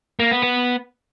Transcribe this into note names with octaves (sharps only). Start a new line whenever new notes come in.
A#3
B3
B3